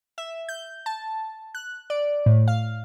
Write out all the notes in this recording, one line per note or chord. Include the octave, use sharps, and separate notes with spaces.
E5
G6
A5
F#6
D5
A2
F5